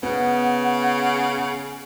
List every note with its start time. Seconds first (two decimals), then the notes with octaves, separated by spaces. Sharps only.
0.03 C#3 B3 F#5